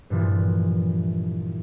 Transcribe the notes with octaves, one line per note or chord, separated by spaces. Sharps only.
G2 A#2 E3 F3